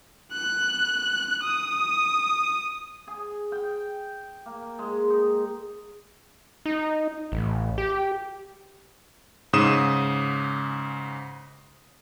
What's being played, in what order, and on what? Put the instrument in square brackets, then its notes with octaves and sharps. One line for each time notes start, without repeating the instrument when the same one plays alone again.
[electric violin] F#6
D#6
[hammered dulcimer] G#4
G5
A#3
G#3
D#4
[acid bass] D#4
A1
G4
[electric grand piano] G#2 C#3 D#6 D#7 E7